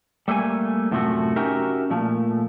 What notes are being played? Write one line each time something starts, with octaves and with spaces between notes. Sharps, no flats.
G3 A3 A#3 C5 G#5
F#2 A2 C3 F3 A3 F#4
C#4 D#4 F#4 G4 A#4 E5
A#2 F3 A3